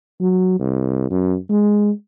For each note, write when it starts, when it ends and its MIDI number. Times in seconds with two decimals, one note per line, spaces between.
0.21 0.59 54
0.60 1.11 36
1.11 1.36 42
1.50 1.91 56